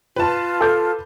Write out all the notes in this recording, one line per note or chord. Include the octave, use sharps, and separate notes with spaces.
F4 B4 A5
A4 D6 G6